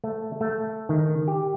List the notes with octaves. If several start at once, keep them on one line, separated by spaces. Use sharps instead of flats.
A3
A3
D#3
G4